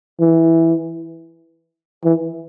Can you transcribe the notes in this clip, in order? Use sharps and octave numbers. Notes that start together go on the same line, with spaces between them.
E3
E3